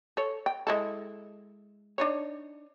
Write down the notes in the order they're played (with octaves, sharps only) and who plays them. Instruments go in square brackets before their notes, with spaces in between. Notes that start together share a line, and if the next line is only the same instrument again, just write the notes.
[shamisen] A4 C#5
G5
G#3 E4 A4
D4 D#4 C#5